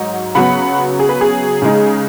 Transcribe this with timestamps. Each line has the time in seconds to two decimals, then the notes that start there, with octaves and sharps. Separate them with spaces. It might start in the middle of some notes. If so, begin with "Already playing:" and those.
Already playing: G#2 F#3 D#4
0.35 C#3 F#3 B3 F#5 B5
0.99 G#4
1.09 B4
1.21 G#4
1.62 C#3 G#3 D#4